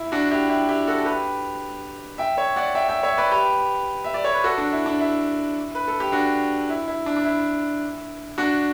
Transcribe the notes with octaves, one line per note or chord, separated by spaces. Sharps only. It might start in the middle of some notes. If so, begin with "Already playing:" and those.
Already playing: E4
D4 F#4
E4 G4
E4 G4
E4 G4
F#4 A4
A4
G4 B4
E5 G5
C#5 E5
D5 F#5
E5 G5
E5 G5
C#5 E5
B4 D5
G4 B4
E5
D5
C#5
B4
F#4 A4
D4
E4
D4
E4
B4
A4
G4
D4 F#4
E4
E4
D4
D4
E4
D4 F#4